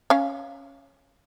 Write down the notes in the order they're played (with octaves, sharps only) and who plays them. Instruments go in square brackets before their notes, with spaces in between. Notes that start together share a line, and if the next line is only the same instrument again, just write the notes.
[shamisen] C#4 F5